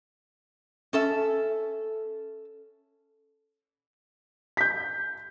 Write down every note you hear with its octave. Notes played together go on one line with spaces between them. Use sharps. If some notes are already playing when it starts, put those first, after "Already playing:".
C#4 A4 E5
G6 B6